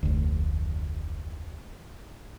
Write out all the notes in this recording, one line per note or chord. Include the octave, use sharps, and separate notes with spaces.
F1 D2